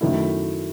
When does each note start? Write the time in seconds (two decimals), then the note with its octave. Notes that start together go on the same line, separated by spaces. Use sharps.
0.01 F#2 D#3 A3 E4